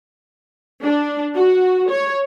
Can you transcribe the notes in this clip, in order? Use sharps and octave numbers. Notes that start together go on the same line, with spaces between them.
D4
F#4
C#5